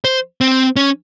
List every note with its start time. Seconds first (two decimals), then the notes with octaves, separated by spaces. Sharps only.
0.05 C5
0.41 C4
0.76 C#4